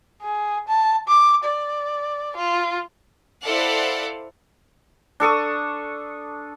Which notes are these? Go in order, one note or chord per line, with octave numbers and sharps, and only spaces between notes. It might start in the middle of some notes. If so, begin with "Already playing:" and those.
G#4
A5
D6
D5
F4
E4 A4 C5 D5 F5 F#5
D4 A4 C#6 D#6